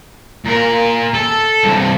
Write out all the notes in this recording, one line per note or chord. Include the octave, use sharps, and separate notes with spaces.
A#2 A#4
A4
G2 C3